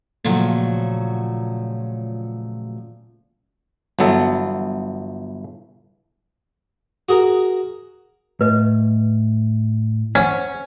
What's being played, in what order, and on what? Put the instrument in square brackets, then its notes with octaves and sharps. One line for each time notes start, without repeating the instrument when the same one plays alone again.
[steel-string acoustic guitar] A#2 C#3 F3 F#3 A3 F#4
[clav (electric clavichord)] G1 E3 F#3 B3 A4
[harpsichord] F#4 G#4 A#4
[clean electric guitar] A2 [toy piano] B4 D#5
[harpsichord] C#4 [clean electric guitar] C5 C#5 F#5